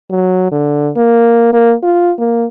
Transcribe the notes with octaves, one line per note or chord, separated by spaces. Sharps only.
F#3
D3
A#3
A#3
F4
A#3